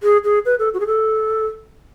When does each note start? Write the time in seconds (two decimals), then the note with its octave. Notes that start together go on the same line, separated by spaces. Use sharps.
0.03 G#4
0.24 G#4
0.46 B4
0.59 A4
0.74 F#4
0.80 G#4
0.87 A4